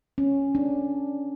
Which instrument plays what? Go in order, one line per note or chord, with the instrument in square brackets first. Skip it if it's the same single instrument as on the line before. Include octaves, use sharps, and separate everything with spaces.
[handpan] C#4
D4